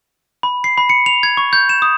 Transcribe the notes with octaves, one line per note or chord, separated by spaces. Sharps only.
B5
C7
B5
C#7
F7
G#6
C#6
G6
E7
D#6